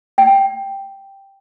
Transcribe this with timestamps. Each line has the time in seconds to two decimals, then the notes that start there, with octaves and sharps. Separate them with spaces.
0.18 G5